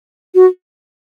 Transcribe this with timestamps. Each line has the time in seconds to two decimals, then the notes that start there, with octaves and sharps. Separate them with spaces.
0.35 F#4